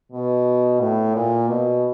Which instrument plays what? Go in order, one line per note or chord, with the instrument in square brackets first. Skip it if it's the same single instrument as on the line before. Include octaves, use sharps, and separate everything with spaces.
[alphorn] B2
A2
A#2
B2